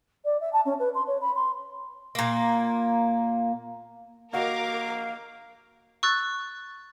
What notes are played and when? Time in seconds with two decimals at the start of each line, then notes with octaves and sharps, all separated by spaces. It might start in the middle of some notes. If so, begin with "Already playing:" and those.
0.25 D5
0.41 E5
0.53 A5
0.66 C#4
0.79 B4
0.95 C6
1.07 C#5
1.21 B5
1.35 C6
2.15 A#2 A#3
4.33 A#3 F#4 A#4 D#5 F5 D6
6.03 C#6 E6 F#6 A6